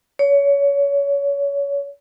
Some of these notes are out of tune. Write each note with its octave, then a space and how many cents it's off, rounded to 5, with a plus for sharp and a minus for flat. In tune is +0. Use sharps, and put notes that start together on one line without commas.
C#5 +25